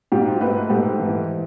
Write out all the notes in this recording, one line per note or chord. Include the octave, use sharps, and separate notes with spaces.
G#2 F4 G4
A3 A4 B4
G#2 G4 A4
E3